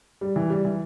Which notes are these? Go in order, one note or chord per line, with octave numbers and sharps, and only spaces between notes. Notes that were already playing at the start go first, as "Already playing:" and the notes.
G3
E3
G3
E3